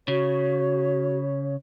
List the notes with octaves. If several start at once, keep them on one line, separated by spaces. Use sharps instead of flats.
C#3 F#4 C#5